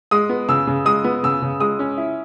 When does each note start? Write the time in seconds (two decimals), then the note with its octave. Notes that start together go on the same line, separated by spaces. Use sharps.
0.11 G#3 D#6
0.29 B3
0.49 C#3 E6
0.67 C#3
0.85 G#3 D#6
1.04 B3
1.23 C#3 E6
1.42 C#3
1.60 G#3 D#6
1.79 C#4
1.97 E4